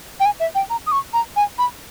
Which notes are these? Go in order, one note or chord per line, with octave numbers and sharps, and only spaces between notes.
G5
G#5
E5
G5
A#5
D#6
C#6
A#5
G#5
B5